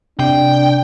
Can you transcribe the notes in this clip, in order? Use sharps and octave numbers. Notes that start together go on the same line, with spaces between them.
C3 D4 G5